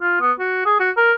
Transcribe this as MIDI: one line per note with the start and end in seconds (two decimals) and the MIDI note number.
0.01 0.17 65
0.21 0.32 59
0.39 0.64 66
0.66 0.78 68
0.80 0.91 66
0.97 1.13 70